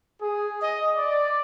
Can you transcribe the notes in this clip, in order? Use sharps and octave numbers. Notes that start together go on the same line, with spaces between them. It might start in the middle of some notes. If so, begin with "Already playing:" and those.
G#4
D#5
D5